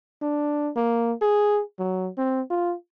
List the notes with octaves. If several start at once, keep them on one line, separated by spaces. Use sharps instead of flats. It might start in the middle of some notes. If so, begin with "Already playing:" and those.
D4
A#3
G#4
F#3
C4
F4